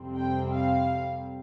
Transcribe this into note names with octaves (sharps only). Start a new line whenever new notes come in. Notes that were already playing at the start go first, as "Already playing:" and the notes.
Already playing: F2 C3 G3 C4
G5
F5